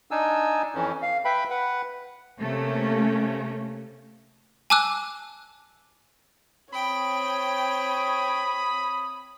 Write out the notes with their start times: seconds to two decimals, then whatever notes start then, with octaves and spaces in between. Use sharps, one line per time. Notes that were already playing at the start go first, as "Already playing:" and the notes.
0.11 D4 D#4 G#5 E6
0.75 F2 E3 C#4
1.02 F5
1.25 B4 E5 G5 B5
1.50 B4 F#5
2.40 C3 A3 A#3 C#4
4.70 G#5 A5 D6 E6 F#6
6.74 C4 C#5 G5 B5 D#6